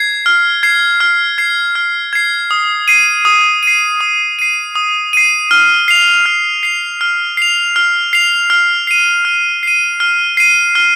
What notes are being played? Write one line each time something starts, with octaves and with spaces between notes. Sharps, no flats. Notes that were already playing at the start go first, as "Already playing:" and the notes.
Already playing: G#6 C7
F6
G#6 C7
F6
G#6 C7
F6
G#6 C7
D#6
C7 D#7
D#6
C7 D#7
D#6
C7 D#7
D#6
C7 D#7
F6
C7 F7
F6
C7 F7
F6
C7 F7
F6
C7 F7
F6
C7 D#7
F6
C7 D#7
F6
C7 D#7
F6